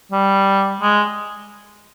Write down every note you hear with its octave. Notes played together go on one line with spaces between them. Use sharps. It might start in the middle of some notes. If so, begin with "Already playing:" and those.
G3
G#3